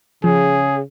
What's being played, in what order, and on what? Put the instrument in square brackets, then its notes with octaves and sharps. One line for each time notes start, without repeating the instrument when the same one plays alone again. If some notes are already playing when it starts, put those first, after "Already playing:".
[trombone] C#3 [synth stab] F3 [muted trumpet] G#4